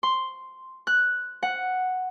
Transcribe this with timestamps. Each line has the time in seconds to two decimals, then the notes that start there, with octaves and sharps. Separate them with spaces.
0.03 C6
0.87 F#6
1.43 F#5